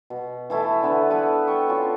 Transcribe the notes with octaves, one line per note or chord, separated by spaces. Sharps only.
B2
E3 A3 E4 A5
D3 B3 B4
E4 A4 B4 C#6
G5 C#6
C#4 F4 F#4